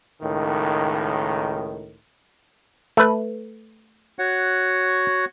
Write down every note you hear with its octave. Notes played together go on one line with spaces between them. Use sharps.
C#2 A2 D#3
A3 B4
F#4 C#5 F#5